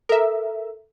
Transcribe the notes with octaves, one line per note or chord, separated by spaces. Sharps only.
A4 A#4 E5